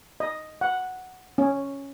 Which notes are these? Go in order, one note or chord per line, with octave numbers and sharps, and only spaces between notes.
D#5
F#5
C#4